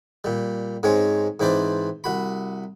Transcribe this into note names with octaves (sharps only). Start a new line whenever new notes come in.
A#2 G3
G#2 G#3 C4 C#4 C#5
G#2 E3 C4 B4 C5 D5
C2 F#4 B5